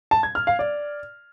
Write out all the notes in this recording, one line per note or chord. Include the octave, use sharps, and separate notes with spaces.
A5
G#6
F6
F5
D5